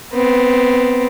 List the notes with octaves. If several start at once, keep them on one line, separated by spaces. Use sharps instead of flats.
B3 C4